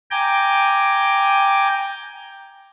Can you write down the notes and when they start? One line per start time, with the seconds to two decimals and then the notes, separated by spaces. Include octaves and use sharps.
0.11 G5 G#5 A#5 D6 G6